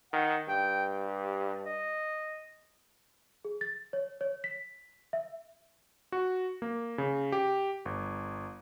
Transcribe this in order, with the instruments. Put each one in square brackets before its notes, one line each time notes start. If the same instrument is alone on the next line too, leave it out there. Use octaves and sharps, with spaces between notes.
[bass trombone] D#3 [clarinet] F#5
[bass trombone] G2 [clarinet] G5
[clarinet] G4
D#5
[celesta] G#4
A6
C#5
C#5
B6
E5
[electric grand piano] F#4
A#3
C#3
G4
G1